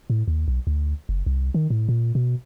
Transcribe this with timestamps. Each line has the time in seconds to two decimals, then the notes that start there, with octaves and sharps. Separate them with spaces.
0.10 A2
0.28 D#2
0.48 B1
0.67 D2
1.09 F#1
1.26 C2
1.54 D#3
1.70 A2
1.89 A#2
2.15 B2